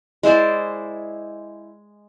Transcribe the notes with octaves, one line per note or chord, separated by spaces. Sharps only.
G#3 E4 C5 D5